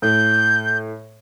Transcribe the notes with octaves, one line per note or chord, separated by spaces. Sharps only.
A2 G6